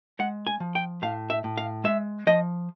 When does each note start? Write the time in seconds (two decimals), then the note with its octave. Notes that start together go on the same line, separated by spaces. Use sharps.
0.19 G#3 F#5
0.47 G#5
0.60 F3
0.75 G5
1.02 A2 F5
1.30 E5
1.44 A2
1.57 F5
1.84 G#3 E5
2.27 F3 D#5